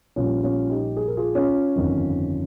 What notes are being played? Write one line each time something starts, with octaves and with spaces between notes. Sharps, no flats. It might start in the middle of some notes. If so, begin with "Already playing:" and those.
A#1 A#2 G3 C#4 F4
C#4 F4
D#4 G4
G#4
A#4
F4 G#4
C#4 F4
G1 F2 D#3